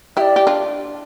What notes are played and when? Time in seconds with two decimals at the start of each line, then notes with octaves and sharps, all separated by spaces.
0.16 E4 G4 D5 E5
0.36 G4
0.47 D4 F4